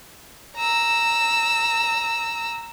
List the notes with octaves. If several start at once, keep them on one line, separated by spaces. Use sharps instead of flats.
A#5 E6